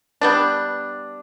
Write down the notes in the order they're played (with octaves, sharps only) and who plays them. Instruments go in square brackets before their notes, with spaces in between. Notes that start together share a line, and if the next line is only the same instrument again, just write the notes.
[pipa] G3 B3 D4